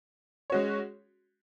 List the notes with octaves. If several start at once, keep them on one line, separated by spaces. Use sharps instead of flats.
G#3 C#4 F#4 C#5